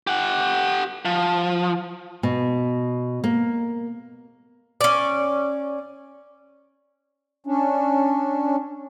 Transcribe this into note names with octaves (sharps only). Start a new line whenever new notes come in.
G4 F#5
F3
B2
A#3
C#4 D5
C#4 D4